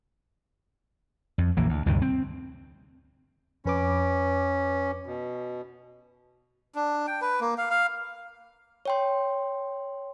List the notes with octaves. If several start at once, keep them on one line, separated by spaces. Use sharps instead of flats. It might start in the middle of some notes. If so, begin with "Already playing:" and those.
F2
A#1 E3 A#3
D2
D2 G2 C3 D#3
C4
F2 C#4 B4 D6
B2
D4
G5
B4
A#3
F5
F5
C#5 G5 C6